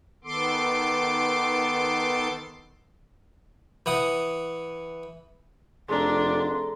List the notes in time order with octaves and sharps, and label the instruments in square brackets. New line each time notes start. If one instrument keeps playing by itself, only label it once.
[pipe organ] D#3 B3 A4 C6 D6
[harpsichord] E3 F#5 D#6
[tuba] F1 [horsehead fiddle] D4 [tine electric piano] G#4 A4 A#5 [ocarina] C6